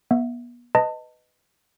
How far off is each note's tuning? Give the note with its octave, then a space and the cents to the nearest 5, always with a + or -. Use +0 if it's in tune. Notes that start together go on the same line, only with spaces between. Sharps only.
B3 -35 E5 +0
B4 +15 D#5 +0 A5 +30